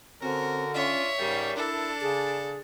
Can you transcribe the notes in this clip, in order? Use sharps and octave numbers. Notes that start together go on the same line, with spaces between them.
D3 C4 C#4 F#4 A#4
C#4 D4 F4 C#5 E5
G#2 C#3 G3 A#4
D4 E4 A4
C#3 G#4